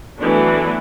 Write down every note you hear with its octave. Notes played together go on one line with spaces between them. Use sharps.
E3 F#3 A3 B3 D4